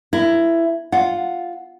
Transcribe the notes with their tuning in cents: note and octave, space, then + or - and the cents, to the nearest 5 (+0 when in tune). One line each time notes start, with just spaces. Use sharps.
E4 +15 A#4 -5
F4 +0 F#5 +0